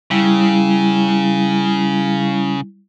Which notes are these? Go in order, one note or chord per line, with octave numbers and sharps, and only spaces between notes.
C#3 G3 E4